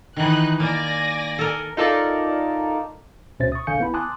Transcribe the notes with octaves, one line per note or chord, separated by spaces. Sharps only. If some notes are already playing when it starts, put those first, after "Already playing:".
D#3 E3 D#4 F#6
A#3 D5 G#5 A#6
A4 A#4
D#4 F4 A4 A#4 D5 A5
C#2 B2 C#4 C5 E5 A6
C#6 D#6
A#1 D3 F5 G#5 G6 C#7
B3 E4 B5
G#5 A5 C6 D6 D#6 F#6